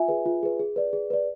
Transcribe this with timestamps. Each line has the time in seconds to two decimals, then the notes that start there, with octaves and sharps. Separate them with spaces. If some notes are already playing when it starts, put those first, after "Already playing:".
Already playing: F4 E5 G#5
0.08 G#4 B4
0.26 F4
0.43 G#4 B4
0.59 G#4
0.76 B4 D5
0.93 G#4
1.10 B4 D5